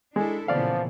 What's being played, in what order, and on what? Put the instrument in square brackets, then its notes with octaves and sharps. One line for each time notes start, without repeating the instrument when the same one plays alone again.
[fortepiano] G#3 [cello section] D4 E4 A4
[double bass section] A#2 C#3 E3 [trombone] F3 [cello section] A#3 B3 [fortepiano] D5 F5